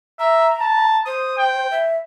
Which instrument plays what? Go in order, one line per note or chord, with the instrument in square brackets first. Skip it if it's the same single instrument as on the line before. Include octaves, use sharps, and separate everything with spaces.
[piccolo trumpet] E5 [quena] A#5
[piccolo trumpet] A5
[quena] C5 [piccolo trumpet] D#6
[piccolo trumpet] G5
[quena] E5